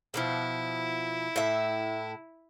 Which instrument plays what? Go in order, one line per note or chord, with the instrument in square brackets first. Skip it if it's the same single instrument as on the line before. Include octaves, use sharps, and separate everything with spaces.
[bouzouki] B2 D3 F3 [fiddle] E4
[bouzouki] A2 E5